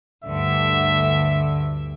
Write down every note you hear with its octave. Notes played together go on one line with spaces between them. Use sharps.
D2 G2 D3 E5